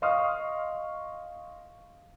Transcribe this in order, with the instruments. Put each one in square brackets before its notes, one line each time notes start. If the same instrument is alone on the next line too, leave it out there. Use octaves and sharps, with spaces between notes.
[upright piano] D#5 F5 C6 C#6 D#6 F6